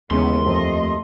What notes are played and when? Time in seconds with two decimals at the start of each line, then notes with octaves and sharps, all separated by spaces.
0.11 D#2 C#3 E3 G#3 B3 C#4 C6
0.46 F2 A3 D#5